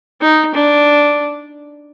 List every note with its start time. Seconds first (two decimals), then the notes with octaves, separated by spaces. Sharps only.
0.21 D#4
0.54 D4